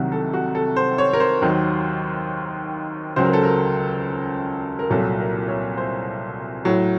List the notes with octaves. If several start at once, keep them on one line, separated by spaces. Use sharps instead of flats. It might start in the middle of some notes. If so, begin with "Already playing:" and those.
Already playing: C2 C3 D#3 F#3 F#4
A4
F#4
A4
C5
C#5
A#4
C5
D#2 D#3 F#3
C#2 C#3 F#3 C5
A#4
A4
A#4
A#4
C2 A#2 F#3 A4
A#4
C#5
C5
A2 F#3